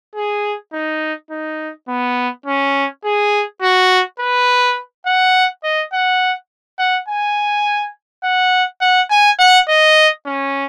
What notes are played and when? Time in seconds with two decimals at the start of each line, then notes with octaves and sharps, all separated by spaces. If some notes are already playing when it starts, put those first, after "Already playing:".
0.16 G#4
0.73 D#4
1.31 D#4
1.89 B3
2.46 C#4
3.04 G#4
3.62 F#4
4.20 B4
5.06 F#5
5.64 D#5
5.93 F#5
6.79 F#5
7.09 G#5
8.24 F#5
8.81 F#5
9.10 G#5
9.39 F#5
9.68 D#5
10.26 C#4